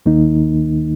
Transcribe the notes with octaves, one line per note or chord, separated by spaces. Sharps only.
D#2 D#3 A#3 D#4